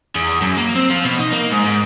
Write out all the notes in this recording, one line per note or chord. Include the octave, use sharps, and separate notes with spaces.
E2
F#2
A#3
C4
F3
B2
D#4
A#3
G#2
G#2